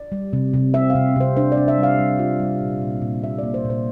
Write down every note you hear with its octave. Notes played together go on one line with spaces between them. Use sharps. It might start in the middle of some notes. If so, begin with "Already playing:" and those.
Already playing: D5
G3
C3
C3
C4 E5
F5
C3
C3 C5
D4 C5
D5
D4
E5
G3
F5
G3
F4
G3
A#2
A#2
A#2
A#2 E5
A#3 D5
C5
A#2
C5